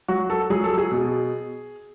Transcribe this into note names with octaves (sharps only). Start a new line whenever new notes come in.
F#3 F#4
A4
F#3 G#4
A4
G#4
B2